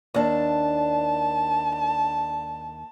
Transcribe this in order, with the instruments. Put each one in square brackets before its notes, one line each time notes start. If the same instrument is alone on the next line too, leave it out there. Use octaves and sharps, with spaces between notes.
[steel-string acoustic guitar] D#2 D4 [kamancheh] A5